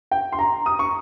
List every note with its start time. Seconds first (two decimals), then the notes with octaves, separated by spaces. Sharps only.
0.11 G5
0.32 C6
0.39 A#5
0.66 D#6
0.79 C#6